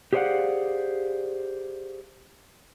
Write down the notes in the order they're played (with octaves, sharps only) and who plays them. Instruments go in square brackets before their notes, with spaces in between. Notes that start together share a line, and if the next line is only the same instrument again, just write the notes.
[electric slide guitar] G4 G#4 C5 D5 F5 F#5